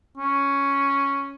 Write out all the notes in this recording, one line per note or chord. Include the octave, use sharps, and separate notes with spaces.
C#4